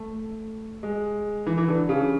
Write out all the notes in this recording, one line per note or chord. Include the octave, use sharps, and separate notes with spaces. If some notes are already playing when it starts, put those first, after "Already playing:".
Already playing: A3
G#3
E3
E3
D3
C#3